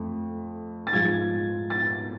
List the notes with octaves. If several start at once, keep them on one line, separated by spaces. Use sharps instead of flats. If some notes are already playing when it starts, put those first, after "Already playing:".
Already playing: F2 A3
A6
G#2 F3 G#3 G#6
A6